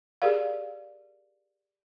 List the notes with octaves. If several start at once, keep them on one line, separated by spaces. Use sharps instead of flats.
G4 G#4 A#4 D5 F5